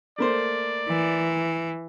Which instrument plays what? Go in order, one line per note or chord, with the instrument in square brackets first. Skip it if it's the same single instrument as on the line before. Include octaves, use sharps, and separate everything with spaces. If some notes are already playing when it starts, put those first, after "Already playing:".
[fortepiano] A3 A#3 C5 [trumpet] D5
[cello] E3